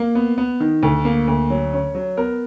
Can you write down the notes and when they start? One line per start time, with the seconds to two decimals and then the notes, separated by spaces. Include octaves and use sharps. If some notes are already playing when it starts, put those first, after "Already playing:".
Already playing: A#3
0.15 B3
0.38 B3
0.60 D#3
0.83 D2
1.05 A#3
1.28 D2
1.50 F#3
1.73 C#4
1.95 F#3
2.17 B3 A#4